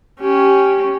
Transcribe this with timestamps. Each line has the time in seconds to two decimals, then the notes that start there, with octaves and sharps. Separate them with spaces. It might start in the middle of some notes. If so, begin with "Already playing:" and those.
0.20 C#4 G4